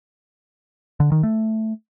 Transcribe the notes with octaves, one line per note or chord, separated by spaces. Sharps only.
D3
D#3
A3